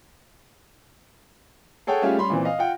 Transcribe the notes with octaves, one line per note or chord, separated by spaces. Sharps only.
G#4 A4 C#5 F#5 G5
G3 A3 C#4 F4 G4 G#4
G3 C#4 B5 C6
A#2 E3 C4
D#5 F5
F4 F#5 G5